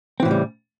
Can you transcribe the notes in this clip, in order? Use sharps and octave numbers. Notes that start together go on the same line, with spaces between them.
A2 C#3 E3 G3 C4